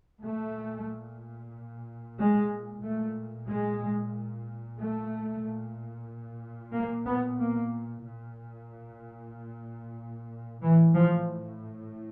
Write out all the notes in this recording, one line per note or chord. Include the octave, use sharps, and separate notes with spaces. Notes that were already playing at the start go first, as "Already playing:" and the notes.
A#2 A3
G#3
A#2 A3
G#3
A3
A#2
A#3
B3
A#3
A#2
A2 E3
F3